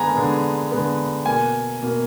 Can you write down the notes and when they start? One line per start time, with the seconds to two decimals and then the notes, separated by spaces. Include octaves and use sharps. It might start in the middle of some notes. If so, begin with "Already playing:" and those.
Already playing: D3 G#3 B3 G#5 A#5
0.14 D3 G#3 B3
0.71 D3 G#3 B3
1.26 B2 A#3 G#5
1.82 B2 A#3